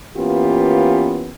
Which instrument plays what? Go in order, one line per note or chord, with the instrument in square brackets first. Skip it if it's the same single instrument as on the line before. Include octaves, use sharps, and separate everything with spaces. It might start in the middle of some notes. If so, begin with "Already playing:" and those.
[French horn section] E3 A#3 B3 C#4 F4 G4